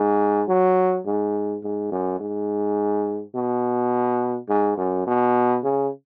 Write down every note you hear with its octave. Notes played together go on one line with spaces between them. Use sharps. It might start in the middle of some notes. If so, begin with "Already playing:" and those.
Already playing: G#2
F#3
G#2
G#2
F#2
G#2
B2
G#2
F#2
B2
C#3